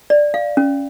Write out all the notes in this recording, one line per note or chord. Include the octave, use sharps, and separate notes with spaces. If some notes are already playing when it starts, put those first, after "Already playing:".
D5
F5
C#4